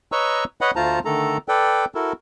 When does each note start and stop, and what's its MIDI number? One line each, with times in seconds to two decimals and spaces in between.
0.12 0.44 71
0.12 0.44 73
0.12 0.44 75
0.12 0.44 82
0.12 0.44 85
0.12 0.44 88
0.61 0.71 71
0.61 0.71 73
0.61 0.71 75
0.61 0.71 78
0.61 0.71 83
0.76 0.99 38
0.76 0.99 57
0.76 0.99 65
0.76 0.99 72
0.76 0.99 81
0.76 0.99 82
1.05 1.37 50
1.05 1.37 51
1.05 1.37 57
1.05 1.37 69
1.05 1.37 82
1.48 1.85 69
1.48 1.85 71
1.48 1.85 74
1.48 1.85 79
1.95 2.13 64
1.95 2.13 66
1.95 2.13 69
1.95 2.13 70